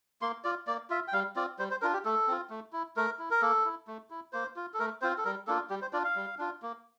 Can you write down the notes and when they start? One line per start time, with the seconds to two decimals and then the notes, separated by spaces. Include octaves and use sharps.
0.22 A#3 C6
0.44 F4 D5
0.67 A#3 D5
0.90 F4 E5
1.08 G5
1.13 G3 F5
1.36 C4 F4 D5
1.59 G3 C5
1.71 C5
1.82 D4 F4 A#4
1.93 G4
2.05 A3 A4
2.27 C4 F4
2.50 A3
2.73 E4
2.97 A3 A#4
3.19 E4
3.31 A#4
3.42 A#3 A4
3.65 E4
3.87 A3
4.10 E4
4.33 A#3 C5
4.56 F4
4.74 A4
4.79 A3 A#4
5.02 C4 F4 C5
5.18 A4
5.25 G3 A#4
5.47 A#3 D4 F4 A4
5.70 G3 G4
5.82 C5
5.93 D4 F4 D5
6.04 F5
6.16 G3
6.38 D4 F4
6.62 A#3